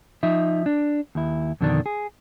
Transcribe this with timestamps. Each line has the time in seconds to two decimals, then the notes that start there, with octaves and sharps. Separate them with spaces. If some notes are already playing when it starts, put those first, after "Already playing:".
0.23 F3 D#4 E5
0.66 D4
1.15 D#2 E4
1.61 F2 B2 D3 D#3 D4
1.86 G#4